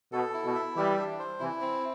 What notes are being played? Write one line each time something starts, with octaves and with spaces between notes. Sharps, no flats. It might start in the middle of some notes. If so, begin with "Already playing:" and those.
B2 A4
E4
B2
E5
E3 G3 G4
D4
C5
C3 E3 E4
C4